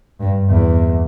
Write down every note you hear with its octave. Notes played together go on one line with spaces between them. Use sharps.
G2
E2